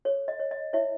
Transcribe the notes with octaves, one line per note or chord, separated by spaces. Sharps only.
A4 C#5
D#5
C#5
D#5
E4 C#5 E5